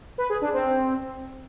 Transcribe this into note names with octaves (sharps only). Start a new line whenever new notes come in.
B4
G#4
D4
C4